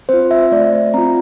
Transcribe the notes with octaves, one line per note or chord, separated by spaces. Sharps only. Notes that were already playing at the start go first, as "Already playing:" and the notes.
C4 F4 C5
E5
A3 D5
C4 F4 A#5